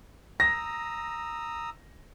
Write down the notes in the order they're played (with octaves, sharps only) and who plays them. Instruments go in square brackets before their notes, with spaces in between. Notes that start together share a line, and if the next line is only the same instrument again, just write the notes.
[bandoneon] A#5 D#6 E6 [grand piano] A#6